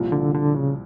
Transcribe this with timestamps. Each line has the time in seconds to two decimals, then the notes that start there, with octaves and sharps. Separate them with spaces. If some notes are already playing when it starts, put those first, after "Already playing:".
Already playing: C2 A#2 F3
0.12 D3
0.34 D3
0.55 C#3